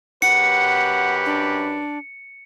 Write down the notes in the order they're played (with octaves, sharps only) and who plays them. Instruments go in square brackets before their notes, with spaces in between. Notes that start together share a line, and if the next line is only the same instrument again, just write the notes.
[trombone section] F#2 G4 B4 [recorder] F#5 [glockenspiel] C#7
[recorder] D4